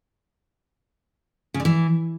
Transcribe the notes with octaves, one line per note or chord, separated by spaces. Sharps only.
C#3
D3
E3